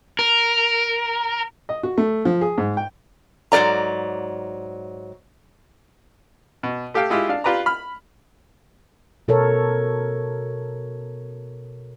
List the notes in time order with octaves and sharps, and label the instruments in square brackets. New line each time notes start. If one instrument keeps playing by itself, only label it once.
[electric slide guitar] A#4
[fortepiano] D#5
F#4
A3
F3
G#4
G#2
G5
[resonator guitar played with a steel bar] G#2 F#3 B4 D5 A#5
[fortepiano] B2
A3 G4 A4 F5 G5
G#3 E4 F4 G4
D4 F5
F4 G4 B4 D5 A#5
B5 F6
[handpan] B2 A4 A#4 C#5